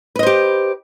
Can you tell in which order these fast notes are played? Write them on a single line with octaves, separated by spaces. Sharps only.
B4 D#5 C5 G4